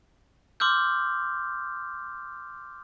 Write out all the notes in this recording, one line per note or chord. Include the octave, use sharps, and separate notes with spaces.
C6 D6 E6 F6 G6